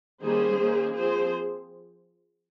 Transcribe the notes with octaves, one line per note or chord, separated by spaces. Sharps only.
D#3 G3 A#3 C#4 G#4 C5
D#3 A#3 C#4
F3 C4 G#4 C5